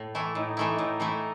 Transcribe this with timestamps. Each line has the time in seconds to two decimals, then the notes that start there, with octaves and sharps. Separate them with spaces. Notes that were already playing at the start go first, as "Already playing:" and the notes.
Already playing: A2
0.15 E3 A3 E4
0.35 A2 D#4
0.57 E3 A3 E4
0.78 A2 D#4
1.00 E3 A3 E4